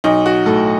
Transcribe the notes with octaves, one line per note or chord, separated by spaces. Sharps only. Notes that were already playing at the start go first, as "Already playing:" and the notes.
B1 D#4
F#4
A2 A4